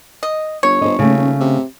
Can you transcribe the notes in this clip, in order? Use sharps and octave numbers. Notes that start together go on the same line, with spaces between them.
D#5
G1 C#5
G1 C5 D#5
D#1 C#3 A3
C3